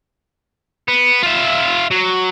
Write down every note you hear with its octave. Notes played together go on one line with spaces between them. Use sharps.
B3
F4 E5
F#3